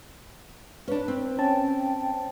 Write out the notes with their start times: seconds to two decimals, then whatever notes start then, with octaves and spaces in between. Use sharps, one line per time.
0.88 C#4 D4 B4
1.08 C4
1.39 C#4 G5 A5